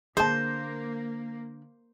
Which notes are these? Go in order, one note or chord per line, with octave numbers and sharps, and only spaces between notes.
D3 A#3 D4 G#4 C5 A5